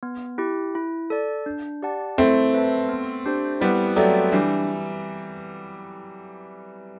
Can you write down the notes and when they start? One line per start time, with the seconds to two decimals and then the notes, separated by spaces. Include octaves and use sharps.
0.03 B3
0.38 E4 G4
0.75 E4
1.10 A4 D5
1.46 D4
1.82 G4 D5 F#5 A5
2.18 A3 C4 E4
2.54 B4 E5 A5
2.89 B3
3.26 D4 G4 C5
3.61 G3 B3 E4
3.96 F#3 A3 A4 D5 G5
4.32 E3 G3 D4